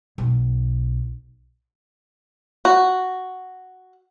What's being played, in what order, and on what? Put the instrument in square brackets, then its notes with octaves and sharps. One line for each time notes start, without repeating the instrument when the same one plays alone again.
[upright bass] B1
[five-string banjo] F#4